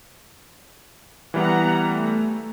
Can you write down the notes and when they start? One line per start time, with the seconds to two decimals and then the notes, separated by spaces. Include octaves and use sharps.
1.34 E3 G3 B3 F#5 A#5
1.88 A3